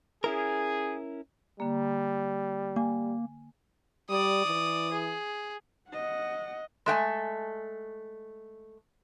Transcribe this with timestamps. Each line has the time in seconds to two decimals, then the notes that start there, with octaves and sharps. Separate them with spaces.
0.24 C#4 E4 G#4 A#4
1.60 D3 G3 A#3
2.76 A#3 G#5
4.10 G3 D5 D#6
4.46 E3
4.92 G#4
5.90 D#5 F#5
6.86 G#3 A3 G5 G#5